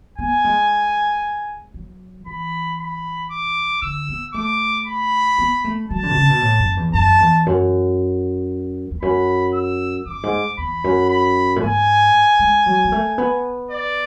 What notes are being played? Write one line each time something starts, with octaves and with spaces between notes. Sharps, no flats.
B3 G#5
G#3
F#3
E3 B5
B5
D6
D3 E6
B3
A3 D6
B5
B3
A3
F#3 A5
D3
B2
C#3
B2
A2
F#2
E2
F#2 A5
E2
F#2
E2
F#2 B5
E6
F#2 D6
G#2
E2 B5
F#2
B5
A2
G#2 G#5
G#3
F#3
G#3
A3
B3
D5